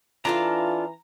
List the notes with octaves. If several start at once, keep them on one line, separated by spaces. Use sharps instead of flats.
E3 D4 F4 A4 F5 A#5